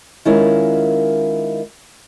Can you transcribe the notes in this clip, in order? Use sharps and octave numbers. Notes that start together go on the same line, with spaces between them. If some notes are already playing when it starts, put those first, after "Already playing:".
D#3 G#3 C#4 E4 F4 A#4